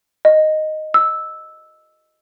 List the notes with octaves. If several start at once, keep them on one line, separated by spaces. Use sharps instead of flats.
D#5
E6